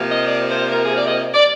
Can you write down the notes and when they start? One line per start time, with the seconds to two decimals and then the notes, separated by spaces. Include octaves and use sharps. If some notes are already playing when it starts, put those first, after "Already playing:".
Already playing: C3 F3 A#3
0.09 D#5
0.25 D5
0.48 C5
0.71 A#4
0.83 G#4
0.95 D5
1.06 D#5
1.34 D5